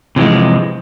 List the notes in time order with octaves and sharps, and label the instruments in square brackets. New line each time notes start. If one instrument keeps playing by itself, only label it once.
[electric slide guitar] C3 E3 F3 G#3